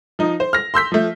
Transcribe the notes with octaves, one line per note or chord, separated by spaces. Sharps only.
F3 D#4
C5
F6 A#6
C6 E6 G6 B6
F3 A3